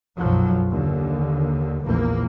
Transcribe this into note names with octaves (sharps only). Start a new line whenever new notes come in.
B1 F#2 F3 F#3
D#2 D3
A#1 E2 A#3